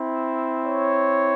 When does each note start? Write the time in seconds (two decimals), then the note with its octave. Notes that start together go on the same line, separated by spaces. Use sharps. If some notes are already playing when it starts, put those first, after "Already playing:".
Already playing: C4 E4
0.65 C#5